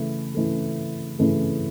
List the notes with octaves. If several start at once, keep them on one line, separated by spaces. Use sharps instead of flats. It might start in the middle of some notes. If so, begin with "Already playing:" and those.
Already playing: C#3 E3 A3
C#3 E3 A3
C#3 E3 A3